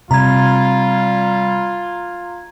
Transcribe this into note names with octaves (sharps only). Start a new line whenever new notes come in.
C3 G3 F4 A#5 G#6